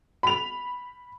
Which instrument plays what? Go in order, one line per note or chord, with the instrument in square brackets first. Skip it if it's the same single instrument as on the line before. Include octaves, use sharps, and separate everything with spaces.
[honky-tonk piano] B5 F7